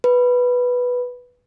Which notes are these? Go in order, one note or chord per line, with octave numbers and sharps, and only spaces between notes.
B4